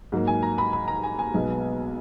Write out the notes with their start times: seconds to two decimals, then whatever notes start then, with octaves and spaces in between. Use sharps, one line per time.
0.12 G#2 F#3 A#3
0.27 G#5
0.43 A#5
0.58 B5
0.73 B5
0.88 A#5
1.03 G#5
1.19 G#5
1.34 B1 B2 G#3 B3